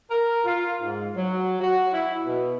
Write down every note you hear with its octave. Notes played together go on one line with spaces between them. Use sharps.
A#4
F4
G#2
F#3
F#4
E4
B2